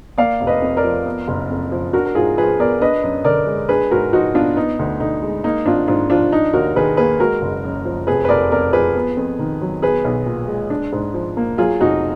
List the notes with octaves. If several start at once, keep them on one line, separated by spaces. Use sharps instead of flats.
A#3 D5 F5
F1
B4 D#5
F2
A#4 D5
F3
B3
F#1
F2
F3
D4 F#4 A#4
A#4
G#2 F4 G#4
F3 G#4 B4
B3 A#4 D5
D4 B4 D#5
F#2
D3 A#4 D5
G#3
D4 G#4 B4
G#2 F#4 A#4
F3 D#4 F#4
B3 D4 F4
B3 D#4
D2
D3 D#4
G#3
A#3 D#4
G#1 D4 F4
G#2 D4 F4
F3 D4 F4
D4 D#4
D#2 F#4 A#4
D#3 G#4 B4
A#3 G#4 B4
G#3 F#4 A#4
F#1
F#2
F3
F1 G#4 B4
B4
F1 A#4 D5
F2 A#4 D5
F3 G#4 B4
B3
F2
D#3
F#3
B3 G#4 B4
B1
A#2
G#3
D4
G#2
F3
A#3
F#3 F4 G#4
F1 D#4 F#4